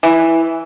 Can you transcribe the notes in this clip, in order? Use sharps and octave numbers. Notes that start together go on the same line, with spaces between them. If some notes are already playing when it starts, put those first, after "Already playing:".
E3